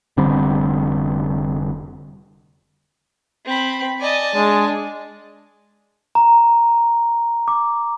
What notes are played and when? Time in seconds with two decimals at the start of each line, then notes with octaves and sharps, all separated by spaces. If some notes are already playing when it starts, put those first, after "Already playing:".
0.17 F1 D3 G3 C4
3.45 C4 B5
4.00 D5 D#5 G#5 A5
4.35 G#3 D4
6.15 A#5
7.48 D6